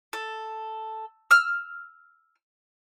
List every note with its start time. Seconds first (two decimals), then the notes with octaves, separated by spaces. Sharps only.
0.13 A4
1.31 E6 F6